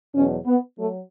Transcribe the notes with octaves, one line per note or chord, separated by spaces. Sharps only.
E2 B2 F#3 C#4
B3
F#3 A3